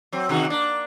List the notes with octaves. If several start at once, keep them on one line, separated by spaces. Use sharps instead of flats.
F#3 C4
C3 D#3 F#4
A#3 D4